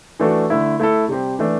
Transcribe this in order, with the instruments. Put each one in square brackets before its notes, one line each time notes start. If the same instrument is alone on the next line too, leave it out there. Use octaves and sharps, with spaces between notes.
[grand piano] E3 A3 D4 F#4 A4
D3 A3 E4
A3 E4 A4
C3 G3 C4 G4
E3 A3 D4